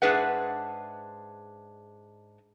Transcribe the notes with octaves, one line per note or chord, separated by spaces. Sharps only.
G#2 D4 G#4 B4 E5 F#5